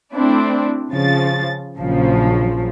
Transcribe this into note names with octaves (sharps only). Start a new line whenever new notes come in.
A3 C4 D4 E4 D5
C#3 F3 A6
A#1 C#3 F3 F#3